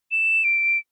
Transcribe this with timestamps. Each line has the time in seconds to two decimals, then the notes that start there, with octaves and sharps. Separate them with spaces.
0.11 E7
0.44 D7